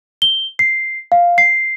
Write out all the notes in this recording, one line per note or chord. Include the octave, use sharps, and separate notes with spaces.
G7
C7
F5
C7